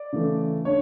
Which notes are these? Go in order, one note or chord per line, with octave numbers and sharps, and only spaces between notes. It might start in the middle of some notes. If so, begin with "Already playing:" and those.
Already playing: D5
C#3 E3 A3
B3 D4 C#5